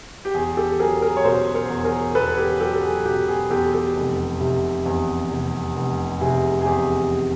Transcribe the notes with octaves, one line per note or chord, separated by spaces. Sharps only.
G4
E2 G#4
G4 A4
F#3 G#4 A#4
G#4 A#4
C#5
B2 A#4 C5
A#4 C5
E2
G#4 A#4
E2 A4 B4
G4 A4
F#3 G4 A4
A4
G#4
B2 G4
G#4
E2 G4 A4
G4 A4
F1
C3
E2
F1
F1
C3 G#4
G#4
E2 G4